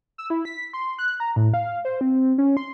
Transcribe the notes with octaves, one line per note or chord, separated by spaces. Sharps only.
E6
E4
B6
C6
F#6
A#5
A2
F5
C5
C4
C#4
C6